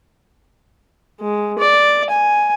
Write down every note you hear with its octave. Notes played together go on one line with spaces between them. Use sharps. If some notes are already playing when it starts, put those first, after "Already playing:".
G#3
D5
G#5